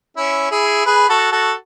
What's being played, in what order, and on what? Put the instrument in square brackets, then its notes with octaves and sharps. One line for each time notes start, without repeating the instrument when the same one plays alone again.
[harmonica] C#4 E4
E4 G#4
G#4 B4
F#4 A4
F#4 A4